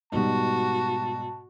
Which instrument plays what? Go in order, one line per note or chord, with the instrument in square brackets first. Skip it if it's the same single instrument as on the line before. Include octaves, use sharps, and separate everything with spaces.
[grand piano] G#2 B2 G3 [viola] F#4 [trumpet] A5